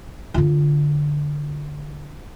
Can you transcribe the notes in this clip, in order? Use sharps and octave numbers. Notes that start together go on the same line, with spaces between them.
D3 F4